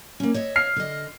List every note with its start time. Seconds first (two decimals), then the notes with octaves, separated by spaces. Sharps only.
0.20 A#3 C#4
0.34 C#5 D#5 E5
0.56 F6 C7
0.76 D3 D#5